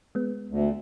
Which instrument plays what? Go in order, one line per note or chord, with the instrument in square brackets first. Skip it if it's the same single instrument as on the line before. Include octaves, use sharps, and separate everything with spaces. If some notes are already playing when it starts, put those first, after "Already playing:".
[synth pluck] G#3 B3
[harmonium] D2